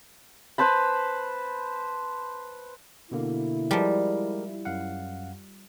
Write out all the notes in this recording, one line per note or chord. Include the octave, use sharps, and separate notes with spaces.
B4 C5 A5 B5
B2 D3 A#3 E4
F3 G3 G#3 G4 A#4
F#2 F5 F#5